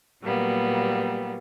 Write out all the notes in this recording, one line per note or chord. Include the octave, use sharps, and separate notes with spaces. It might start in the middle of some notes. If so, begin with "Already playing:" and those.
A#2 F#3 G3 A#3 B3